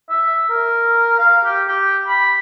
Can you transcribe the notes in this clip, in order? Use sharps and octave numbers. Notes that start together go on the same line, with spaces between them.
E5
A#4
F5
G4
G4
B5